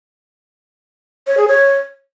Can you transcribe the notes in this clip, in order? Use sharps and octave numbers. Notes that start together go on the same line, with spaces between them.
C#5
G#4
C#5